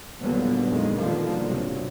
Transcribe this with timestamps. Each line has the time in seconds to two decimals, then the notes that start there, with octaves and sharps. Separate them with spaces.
0.21 D#2 A#2 D3 F#3 G3 B3
0.69 F2 A#2 D#3 G#3
0.99 B2 D3 D#3 F3 G3 A#3
1.46 G2 C3 F#3